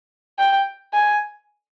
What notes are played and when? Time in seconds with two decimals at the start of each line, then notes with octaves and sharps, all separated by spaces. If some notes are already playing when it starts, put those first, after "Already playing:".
0.38 G5
0.93 G#5